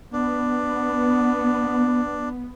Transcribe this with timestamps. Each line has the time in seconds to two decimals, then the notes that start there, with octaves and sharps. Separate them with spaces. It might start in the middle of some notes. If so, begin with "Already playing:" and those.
0.13 B3 D4